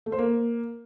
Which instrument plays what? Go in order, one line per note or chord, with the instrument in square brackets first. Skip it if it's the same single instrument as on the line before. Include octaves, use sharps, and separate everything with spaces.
[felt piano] A3
C5
A#3